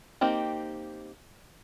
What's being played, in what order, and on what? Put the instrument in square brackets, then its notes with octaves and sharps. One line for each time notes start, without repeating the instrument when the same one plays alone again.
[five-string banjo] A#3 C4 D#4 G4